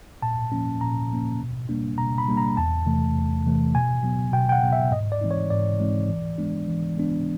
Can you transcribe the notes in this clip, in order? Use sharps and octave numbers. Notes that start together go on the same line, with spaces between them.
A#2 A5
F3 A#3 C#4
A#2 A#5
F3 A#3 C#4
B2
G3 A#3 D4
B2 A#5
B5
G3 A#3 D4
A#5
E2 A5
C3 E3 A3
E2
C3 E3 A3
B2 G#5
F#3 B3
B2 G5
G5
F#5
F#3 B3
E5
G#2 D#5
D5
E3 G#3 C4 D#4
C#5
G#2 D5
E3 G#3 C4 D#4
E3
G#3 B3 D4
E3
G#3 B3 D4